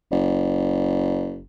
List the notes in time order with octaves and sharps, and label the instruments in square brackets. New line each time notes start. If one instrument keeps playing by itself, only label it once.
[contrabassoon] F#1